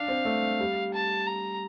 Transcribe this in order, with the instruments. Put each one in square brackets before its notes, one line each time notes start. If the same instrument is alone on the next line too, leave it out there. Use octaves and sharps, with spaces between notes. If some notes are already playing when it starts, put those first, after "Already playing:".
Already playing: [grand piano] D4 [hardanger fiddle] F5
[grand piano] C4
A3
G3
[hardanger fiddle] A5
A#5